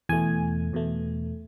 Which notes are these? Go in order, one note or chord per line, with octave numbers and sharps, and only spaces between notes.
E2 B2 A3 G#5
E2 B2 A3